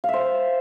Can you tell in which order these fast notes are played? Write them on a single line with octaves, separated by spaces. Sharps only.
F5 E5 C5